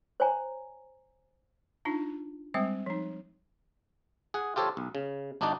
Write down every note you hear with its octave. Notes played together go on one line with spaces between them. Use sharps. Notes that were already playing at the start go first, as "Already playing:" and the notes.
C5 C#5 G#5 A#5
D4 D#4 F4
G3 G#3 C4 C5 G5
F3 D#4
G#4 F#5
F4 G4 A4 C5 C#5
B1
C#3
G1 D4 D#4 F#4 D5 A5